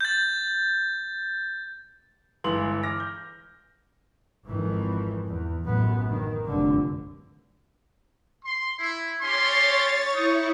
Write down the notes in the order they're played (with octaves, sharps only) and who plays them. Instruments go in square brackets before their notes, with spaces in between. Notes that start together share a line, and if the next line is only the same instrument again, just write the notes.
[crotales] G6 A6
[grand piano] G1 E3 G#3 C6 F#7
D6 F6 A#6
G6
[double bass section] G#1 F2 D#3 E3
E2
A1 F#2 B3
D#3
F1 B1 G2 D3
[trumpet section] C6
E4
[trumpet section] C#4 G4 C6 [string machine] C#5 A6
[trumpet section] D#4 C#6 D#6 [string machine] E4